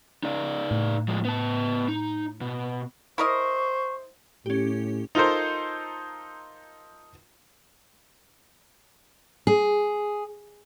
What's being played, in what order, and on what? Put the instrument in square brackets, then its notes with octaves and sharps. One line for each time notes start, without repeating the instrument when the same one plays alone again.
[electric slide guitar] D#4 G#4 D5
[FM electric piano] A2
[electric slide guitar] F3 G#3
B3 A5
D#4
B2
[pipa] E4 A#4 D#5 [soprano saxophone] C5 [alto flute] C#6
[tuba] A2 [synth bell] C#4 G4
[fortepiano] D#4 F4 A4 A#4 C5
[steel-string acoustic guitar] G#4